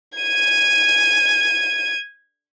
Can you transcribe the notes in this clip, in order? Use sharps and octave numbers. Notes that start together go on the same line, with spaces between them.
G#6 D#7